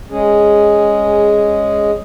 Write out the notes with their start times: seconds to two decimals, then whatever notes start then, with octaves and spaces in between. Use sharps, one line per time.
0.10 G#3 C#4 G#4